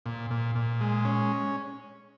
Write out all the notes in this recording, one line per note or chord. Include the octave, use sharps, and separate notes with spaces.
A#2
A#2
A#2
G#3
C#4